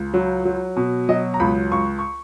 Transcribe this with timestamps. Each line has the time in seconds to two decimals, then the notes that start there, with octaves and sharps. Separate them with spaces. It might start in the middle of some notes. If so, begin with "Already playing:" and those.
Already playing: C#2
0.14 F#3
0.45 F#3
0.76 B2
1.09 F#3 D#5
1.34 A#5
1.40 C#2 B5
1.72 C#2 C#6
1.99 C#6